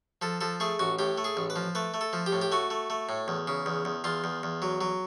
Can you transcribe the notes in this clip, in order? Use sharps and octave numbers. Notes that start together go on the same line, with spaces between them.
F3 A4
F3 A4
A3 G#4
A1 F#4
A2 G4
A3
G#4
A1
B4
F3
A3 B4
A3
A4
F3
G4
A2
G4
A3 F#4
A3
A3
A2
E2
C#3
E2
E2
E2 F4
E2
E2
F#3
F#3